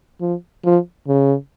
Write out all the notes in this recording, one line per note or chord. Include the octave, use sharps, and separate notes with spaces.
F3
F3
C#3